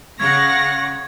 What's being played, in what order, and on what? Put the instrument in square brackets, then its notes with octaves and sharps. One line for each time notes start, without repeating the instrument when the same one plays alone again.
[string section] C#3 A#6 [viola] F5 F#5 [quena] C#6 [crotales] G#6